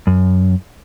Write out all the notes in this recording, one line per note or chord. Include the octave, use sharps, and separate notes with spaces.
F#2